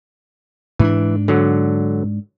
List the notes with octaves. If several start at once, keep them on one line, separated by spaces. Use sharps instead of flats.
G#2 E3 D4
D3 F#3